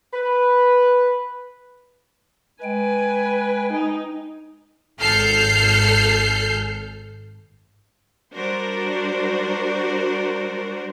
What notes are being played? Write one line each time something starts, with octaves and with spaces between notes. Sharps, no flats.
B4
G#3 B4 G5 G#5
D#4
G#1 A4 F6 G6 C7
G3 D4 F#4 A#4 C5